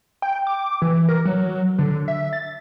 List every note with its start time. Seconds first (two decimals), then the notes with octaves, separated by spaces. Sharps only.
0.22 G5
0.47 D6
0.82 E3
1.09 A#4
1.25 F#3
1.79 D3
2.08 E5
2.33 A6